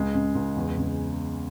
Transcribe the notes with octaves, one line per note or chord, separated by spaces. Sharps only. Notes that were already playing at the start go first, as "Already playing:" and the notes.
Already playing: C#2 G#3
C#3
C#2
E2
C#3